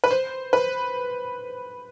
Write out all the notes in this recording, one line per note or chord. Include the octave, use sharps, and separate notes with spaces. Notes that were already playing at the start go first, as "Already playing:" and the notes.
B4
C5
B4